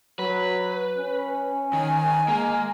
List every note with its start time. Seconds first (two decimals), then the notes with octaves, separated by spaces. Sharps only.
0.19 F#3 B4
0.99 C#4
1.73 D#3 G#5
2.28 G#3 A#3